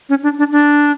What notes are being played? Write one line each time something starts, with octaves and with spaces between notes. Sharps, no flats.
C#4
D4
D4
D4